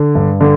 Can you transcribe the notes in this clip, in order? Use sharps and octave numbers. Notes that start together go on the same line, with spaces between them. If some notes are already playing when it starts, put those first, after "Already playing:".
Already playing: D3
G2
D3